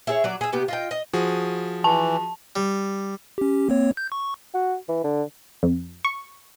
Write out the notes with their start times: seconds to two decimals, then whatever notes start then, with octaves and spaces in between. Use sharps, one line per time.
0.07 E4 G#4 C#5
0.24 F#3 D5
0.41 G#4 E5
0.53 C3 B3 G4
0.68 F4 D#5 G5
0.91 D#5
1.13 F3 F#4 G#4
1.84 E3 A5
2.56 G3
3.38 C#4 G4
3.69 A#3 C4 C#5
3.97 G6
4.12 C#6
4.54 F#4
4.89 E3
5.04 D3
5.63 F2
6.05 C#6